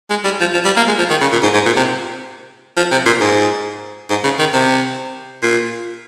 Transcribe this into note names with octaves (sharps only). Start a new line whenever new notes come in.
G#3
G3
F3
F3
G3
A#3
G#3
F3
D#3
C#3
A#2
G#2
G#2
A#2
C3
F3
C3
A#2
G#2
G#2
C#3
D#3
C3
A#2